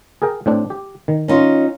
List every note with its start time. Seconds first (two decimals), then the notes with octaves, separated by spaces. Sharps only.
0.22 G#4 A#4 G5
0.46 A2 C4 D4
0.70 G4
1.08 D#3
1.28 C#4 D#4 F4